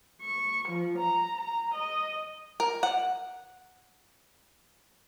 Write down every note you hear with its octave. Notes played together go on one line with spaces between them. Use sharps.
C#6
F3
A#5
A#5
D#5
A#4
F#5